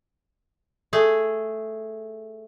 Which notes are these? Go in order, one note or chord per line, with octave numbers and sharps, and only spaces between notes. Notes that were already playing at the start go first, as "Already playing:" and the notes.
A3 G#4